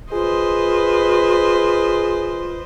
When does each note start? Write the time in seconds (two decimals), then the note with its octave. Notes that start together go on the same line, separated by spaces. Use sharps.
0.12 F4 G#4 B4 C5 D#5